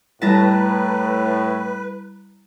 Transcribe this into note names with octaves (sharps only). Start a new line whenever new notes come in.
A2 G3 E4 B4 A5 A#5 B6